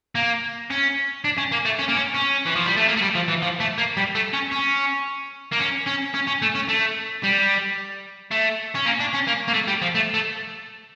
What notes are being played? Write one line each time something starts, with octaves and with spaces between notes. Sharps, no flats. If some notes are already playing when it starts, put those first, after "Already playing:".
A#3
C#4
D4
C#4
A#3
A3
C#4
A#3
C#4
C#4
E3
F3
G3
A3
A#3
A3
G3
F3
E3
F3
A3
A#3
G3
A3
C#4
C#4
A#3
C#4
C#4
C#4
C#4
A3
C#4
A3
G3
A3
C#4
A#3
D4
C#4
A#3
A#3
A3
G3
F3
A3
A3